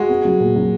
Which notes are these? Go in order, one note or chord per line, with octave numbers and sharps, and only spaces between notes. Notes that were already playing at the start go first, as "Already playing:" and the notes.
Already playing: G#3 F#4
B3
F#3
A#2
F#3